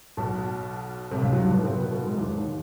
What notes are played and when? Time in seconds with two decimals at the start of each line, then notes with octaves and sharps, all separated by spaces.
0.17 B1 B2
1.11 C2 C3
1.23 C#2 C#3
1.32 F#2 F#3
1.43 G2 G3
1.54 B2 B3
1.64 C3 C4
1.74 B3
1.84 A#3
1.91 B2 B3
2.06 G#2 G#3
2.17 E2 E3
2.27 D#2 D#3
2.37 D#2 D#3